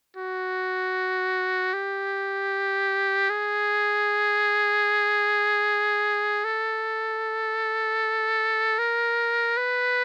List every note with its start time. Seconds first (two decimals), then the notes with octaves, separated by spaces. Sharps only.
0.16 F#4
1.73 G4
3.30 G#4
6.44 A4
8.78 A#4
9.57 B4